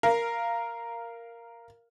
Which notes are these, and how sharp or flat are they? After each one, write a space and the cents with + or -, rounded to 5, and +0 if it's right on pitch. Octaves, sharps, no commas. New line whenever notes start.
A#4 +0 F5 -15